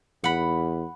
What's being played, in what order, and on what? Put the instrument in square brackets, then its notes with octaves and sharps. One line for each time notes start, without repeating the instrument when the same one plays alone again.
[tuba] E2 [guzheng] F#5 B5